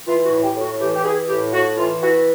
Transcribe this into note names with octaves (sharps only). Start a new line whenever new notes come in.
E3 F4
F#4
A2
G4
A2
F#4
E3 G4
G4
E3 G#4
A2 G4
A2 F#4
E3 F4
E3 F#4